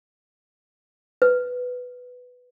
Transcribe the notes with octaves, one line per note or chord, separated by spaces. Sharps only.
B4